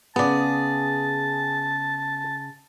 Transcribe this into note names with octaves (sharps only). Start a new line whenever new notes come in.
C#3 B3 G#4 D5 A5